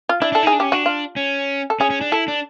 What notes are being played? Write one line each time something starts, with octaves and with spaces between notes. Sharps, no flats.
F4
D4 E4
D4 A4
D#4 G#4
D4
C#4 G4
D4 F#4
F4
C#4
A4
C#4 G#4
C#4
D4
E4 A4
D4